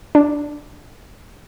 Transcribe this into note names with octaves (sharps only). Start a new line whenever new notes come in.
D4